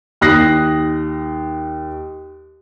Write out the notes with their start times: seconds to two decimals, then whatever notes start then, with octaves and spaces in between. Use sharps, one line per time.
0.21 D#2 D#6 F#6 A#6 C7